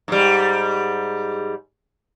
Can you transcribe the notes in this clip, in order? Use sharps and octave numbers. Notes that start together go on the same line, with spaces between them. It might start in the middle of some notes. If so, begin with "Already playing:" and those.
G#2 G3